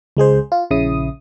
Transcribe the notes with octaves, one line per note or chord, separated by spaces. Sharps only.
C#2 G#3 G#4 C5
F4
A#1 C#3 E4 D#6